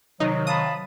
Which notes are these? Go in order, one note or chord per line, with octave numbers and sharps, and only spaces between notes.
C3 D#3 F#3 D#4 D#5
F5 A5 B5 D#6